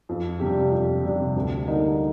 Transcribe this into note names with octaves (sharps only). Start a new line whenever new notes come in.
F2
C3 G3 D4 G4
F2
C3 G3 D4 G4
D2
D3 G3 A#3 D#4